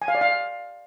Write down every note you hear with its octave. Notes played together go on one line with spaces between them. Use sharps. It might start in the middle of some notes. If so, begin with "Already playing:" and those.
G#5
F5
D5
F5